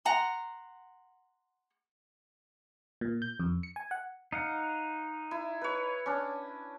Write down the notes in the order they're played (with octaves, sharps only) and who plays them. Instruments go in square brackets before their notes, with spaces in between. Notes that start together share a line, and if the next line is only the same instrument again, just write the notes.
[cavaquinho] F#5 A#5 C6
[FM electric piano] A#2
G6
F2
C#7
G#5
F#5
[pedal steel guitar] D#4 F5 F#5
[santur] E4
B4 C#5
C#4 D4